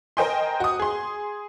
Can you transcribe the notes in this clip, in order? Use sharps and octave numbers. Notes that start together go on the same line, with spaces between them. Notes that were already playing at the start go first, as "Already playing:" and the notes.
A#4 C5 D#5 G5 G#5 C6
F#4 D#6
G#4 C6